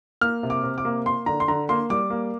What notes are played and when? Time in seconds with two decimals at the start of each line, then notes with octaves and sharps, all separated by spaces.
0.21 A#3 F6
0.43 C3
0.50 D6
0.63 C3
0.78 D6
0.85 A#3
1.06 A#3 C6
1.26 D3 A#5
1.40 C6
1.48 D3 A#5
1.69 A#3 C6
1.90 G3 D6
2.10 A#3